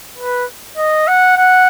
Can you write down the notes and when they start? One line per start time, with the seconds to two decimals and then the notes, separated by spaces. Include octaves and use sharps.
0.18 B4
0.77 D#5
1.08 F#5
1.37 F#5